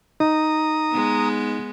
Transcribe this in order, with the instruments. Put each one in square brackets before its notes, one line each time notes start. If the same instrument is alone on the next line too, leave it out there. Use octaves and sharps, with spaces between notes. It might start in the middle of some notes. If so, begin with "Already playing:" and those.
[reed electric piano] D#4 [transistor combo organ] A#5 D#6
[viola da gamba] G#3 B3